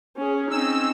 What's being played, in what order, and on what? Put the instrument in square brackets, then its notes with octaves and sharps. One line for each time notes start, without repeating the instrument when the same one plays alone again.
[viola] C#4 G#4
[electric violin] C4 C#4 [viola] D#4 [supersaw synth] E6